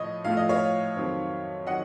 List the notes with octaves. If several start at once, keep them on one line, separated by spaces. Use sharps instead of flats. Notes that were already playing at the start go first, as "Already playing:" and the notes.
Already playing: A2 F3 A3 C#5 D#5
A2 F3 A3 F5
D#5
C#5 F5
F2 D#3 F#3 C4 D#4
D#3 F#3 D#5 F#5